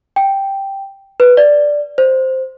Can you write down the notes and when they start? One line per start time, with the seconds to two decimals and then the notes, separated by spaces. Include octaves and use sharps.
0.16 G5
1.20 B4
1.37 D5
1.98 C5